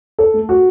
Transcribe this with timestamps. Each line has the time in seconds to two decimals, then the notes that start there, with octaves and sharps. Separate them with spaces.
0.19 A4
0.34 A3
0.49 F#4